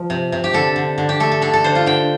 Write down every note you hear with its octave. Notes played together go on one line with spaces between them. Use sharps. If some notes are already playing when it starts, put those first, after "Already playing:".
Already playing: F3
C3
C3
G4
D3 A4
D3
D3
G4
A3 A4
A4
D3 A4
A4
D3 C5
F4
D3 G5